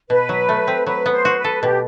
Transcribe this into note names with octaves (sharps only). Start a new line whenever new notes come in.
B2 B4
F#3
A3
C4
F#3 B4
B3
C5
F#4
B4
A4
B2 G4